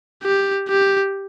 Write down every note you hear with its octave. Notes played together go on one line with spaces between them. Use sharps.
G4
G4